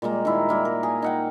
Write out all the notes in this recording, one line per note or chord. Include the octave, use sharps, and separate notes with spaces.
A#2 G3 G#3 A#3
D#3 E4
G3 A#3 E4
A#4
G#4
D#4 F#5 G5